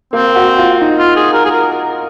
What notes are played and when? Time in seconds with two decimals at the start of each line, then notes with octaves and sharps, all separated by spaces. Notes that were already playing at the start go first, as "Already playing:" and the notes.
0.13 A#3 C4
0.36 F#4
0.59 F4
0.81 D#4
0.98 F4
1.16 G#4
1.33 A#4
1.45 G#4
1.51 A#4